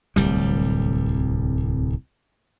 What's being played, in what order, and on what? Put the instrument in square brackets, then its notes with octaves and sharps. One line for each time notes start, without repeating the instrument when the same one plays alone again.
[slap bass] D1 C2 G3